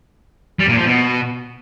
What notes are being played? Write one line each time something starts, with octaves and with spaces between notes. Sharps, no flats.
G3
A#2
F3
B2